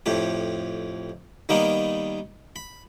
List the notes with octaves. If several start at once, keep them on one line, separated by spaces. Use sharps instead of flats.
F2 A2 G4
D#3 G3 A#3 B3 D#4
B5